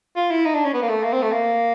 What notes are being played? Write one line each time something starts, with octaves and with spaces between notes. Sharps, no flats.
F4
E4
D#4
D4
C#4
B3
A#3
A3
A#3
C4
A3
A#3